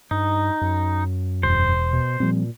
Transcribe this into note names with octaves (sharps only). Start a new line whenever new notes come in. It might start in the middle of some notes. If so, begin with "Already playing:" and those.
G2 D#4
F#2
E1 C5
B2
A#2 F3 G3 C4